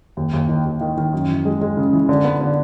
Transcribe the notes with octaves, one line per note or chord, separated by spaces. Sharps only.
D#2
D#2
D#3
D#2
D#3
D#3
F#2
E3
G#3
G#3
C#3
E3
D3
B3
D3